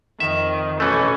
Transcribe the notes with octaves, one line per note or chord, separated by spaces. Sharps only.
F2 D#3 E5
B1 E3 A3 C#4